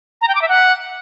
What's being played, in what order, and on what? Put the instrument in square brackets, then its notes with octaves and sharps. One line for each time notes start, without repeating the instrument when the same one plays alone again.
[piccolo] A#5
G5
D6
E5
F#5